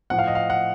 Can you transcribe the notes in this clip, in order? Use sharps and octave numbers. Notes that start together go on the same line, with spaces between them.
A2 F3 F#5
F5
D#5
F5
F#5